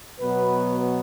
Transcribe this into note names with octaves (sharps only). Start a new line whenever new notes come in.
B2 F#3 B3 B4